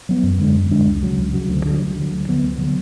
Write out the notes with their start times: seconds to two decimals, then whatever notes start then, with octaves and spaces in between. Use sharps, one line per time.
0.09 F#3 B3
0.23 F#2
0.39 D3 G#3 D4
0.55 F#2
0.70 D3 G#3 D4
0.86 C#2
1.03 C#3 F#3
1.18 C#2
1.33 C#3 F#3
1.49 D2
1.66 D3 F#3
1.81 D2
1.96 D3
2.01 F#3
2.13 D2
2.28 D3 F#3 B3
2.43 D2
2.58 D3 F#3 B3